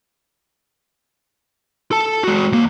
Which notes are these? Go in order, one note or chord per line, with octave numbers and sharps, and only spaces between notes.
A4 A5
G#3 F#4
D#2 A#3